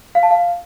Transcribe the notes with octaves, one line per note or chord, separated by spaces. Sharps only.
F5
A5
F5